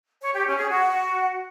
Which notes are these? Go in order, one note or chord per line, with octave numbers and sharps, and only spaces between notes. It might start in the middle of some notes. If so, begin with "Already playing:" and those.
C#5
G4
C#4
G#4
F#4